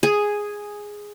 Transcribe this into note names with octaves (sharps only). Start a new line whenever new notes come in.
G#4